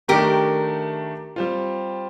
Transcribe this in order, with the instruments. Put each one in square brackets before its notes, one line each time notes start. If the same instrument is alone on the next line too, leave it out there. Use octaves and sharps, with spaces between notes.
[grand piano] D#3 A3 D4 [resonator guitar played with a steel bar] G4 A#4
[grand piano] G3 C4 F4